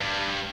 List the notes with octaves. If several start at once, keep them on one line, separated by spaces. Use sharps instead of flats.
G2